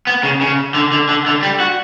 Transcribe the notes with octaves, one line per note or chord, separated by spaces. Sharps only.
B3
C#3
C#3
D3
D3
D3
D3
G3
F#4